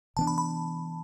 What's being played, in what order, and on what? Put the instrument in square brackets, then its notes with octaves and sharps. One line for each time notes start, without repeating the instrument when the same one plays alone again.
[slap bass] C3 E3 B3 D4 [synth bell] A5
[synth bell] B5
B5